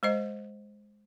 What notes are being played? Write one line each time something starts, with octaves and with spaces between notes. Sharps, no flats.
G#3 C5 D#5